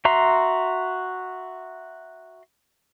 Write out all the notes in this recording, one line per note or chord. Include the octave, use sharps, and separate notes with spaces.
F#4 E5 A#5 C6